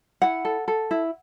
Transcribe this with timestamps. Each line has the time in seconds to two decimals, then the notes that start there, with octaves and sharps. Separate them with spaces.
0.22 E4 F#5
0.45 A4
0.68 A4
0.91 E4